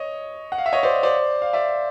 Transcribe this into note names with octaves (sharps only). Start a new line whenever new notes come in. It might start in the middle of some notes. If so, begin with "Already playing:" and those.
Already playing: C#5 D#5
F#5
F5
E5
C#5 D#5
C5 D5
C5 D5
F5
D5 E5